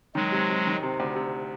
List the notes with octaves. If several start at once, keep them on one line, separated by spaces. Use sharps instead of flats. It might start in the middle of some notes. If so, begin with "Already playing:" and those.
D#3 F#3 G#3
C3
C3
D#3
C3
D2
C3